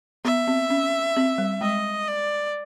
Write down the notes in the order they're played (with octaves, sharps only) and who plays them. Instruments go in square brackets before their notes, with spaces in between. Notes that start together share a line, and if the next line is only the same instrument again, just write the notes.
[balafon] B3 [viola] E5
[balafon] C4
C#4
C4
G3
[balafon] G#3 [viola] D#5
[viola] D5